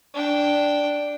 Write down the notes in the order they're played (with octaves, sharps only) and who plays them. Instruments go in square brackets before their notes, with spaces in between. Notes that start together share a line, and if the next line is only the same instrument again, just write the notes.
[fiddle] D4 G5